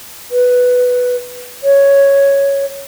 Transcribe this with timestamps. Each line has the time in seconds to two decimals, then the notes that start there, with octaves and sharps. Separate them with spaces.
0.31 B4
1.64 C#5